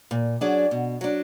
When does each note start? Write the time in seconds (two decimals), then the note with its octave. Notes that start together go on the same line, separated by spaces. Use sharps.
0.11 A#2
0.41 F#3 D4 G#4 D5
0.71 B2
1.01 F#3 D4